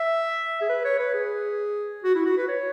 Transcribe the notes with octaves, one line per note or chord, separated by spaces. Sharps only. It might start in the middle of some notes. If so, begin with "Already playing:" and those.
Already playing: E5
G#4
B4
C#5
B4
G#4
F#4
E4
F#4
B4
C#5